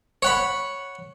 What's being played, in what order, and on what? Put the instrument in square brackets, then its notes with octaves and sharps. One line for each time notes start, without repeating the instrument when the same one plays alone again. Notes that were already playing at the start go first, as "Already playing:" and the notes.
[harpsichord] C#5 F#5 B5